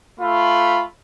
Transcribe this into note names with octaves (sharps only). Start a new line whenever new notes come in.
A3 F4 B5